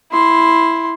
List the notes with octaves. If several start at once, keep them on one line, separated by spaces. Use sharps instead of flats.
E4 C6